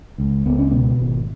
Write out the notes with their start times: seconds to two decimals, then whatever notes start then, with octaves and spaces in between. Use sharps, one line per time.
0.18 C#2
0.45 C#2 B3
0.59 C#4
0.71 B2 B3
1.00 G#1